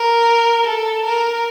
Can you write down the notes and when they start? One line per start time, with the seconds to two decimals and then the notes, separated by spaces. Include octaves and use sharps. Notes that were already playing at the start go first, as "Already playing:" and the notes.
Already playing: A#4
0.66 A4
1.05 A#4